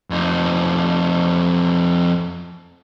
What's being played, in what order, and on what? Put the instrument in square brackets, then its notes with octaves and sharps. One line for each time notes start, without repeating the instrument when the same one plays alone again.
[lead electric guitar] F2 D#4